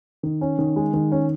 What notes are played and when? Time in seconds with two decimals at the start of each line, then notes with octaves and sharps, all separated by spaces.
0.23 D#3
0.41 C#4
0.59 D#3
0.76 G#3
0.94 D#3
1.12 C#4